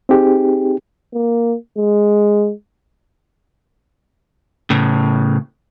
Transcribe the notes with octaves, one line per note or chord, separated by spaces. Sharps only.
C4 D#4 G4 G#4
A#3
G#3
A2 C#3